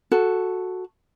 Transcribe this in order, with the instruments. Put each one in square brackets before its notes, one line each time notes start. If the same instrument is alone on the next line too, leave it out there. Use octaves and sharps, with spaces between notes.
[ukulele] F#4 A4